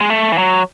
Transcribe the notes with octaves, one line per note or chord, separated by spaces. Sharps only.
G#3
A3
E3
F#3